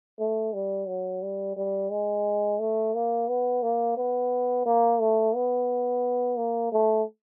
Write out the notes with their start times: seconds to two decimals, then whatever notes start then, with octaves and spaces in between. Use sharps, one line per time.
0.20 A3
0.54 G3
0.88 F#3
1.23 G3
1.57 G3
1.91 G#3
2.60 A3
2.95 A#3
3.29 B3
3.63 A#3
3.97 B3
4.66 A#3
5.01 A3
5.35 B3
6.37 A#3
6.72 A3